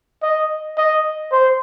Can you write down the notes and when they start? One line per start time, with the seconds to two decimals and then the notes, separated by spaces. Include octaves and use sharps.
0.23 D#5
0.77 D#5
1.32 C5